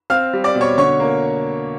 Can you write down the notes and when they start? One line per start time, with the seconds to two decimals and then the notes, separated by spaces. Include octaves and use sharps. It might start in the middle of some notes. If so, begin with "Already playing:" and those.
0.10 C4 F5 F6
0.33 G3
0.44 D5 D6
0.55 B2
0.61 C#5 C#6
0.78 D3 C#5 C#6
1.00 A#3